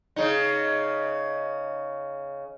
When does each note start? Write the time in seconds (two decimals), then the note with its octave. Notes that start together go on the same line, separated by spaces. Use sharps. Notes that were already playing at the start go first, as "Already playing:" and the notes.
0.16 C#3 D#4